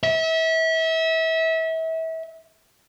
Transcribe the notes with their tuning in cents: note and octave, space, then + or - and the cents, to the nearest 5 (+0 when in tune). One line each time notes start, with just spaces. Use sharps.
E5 -30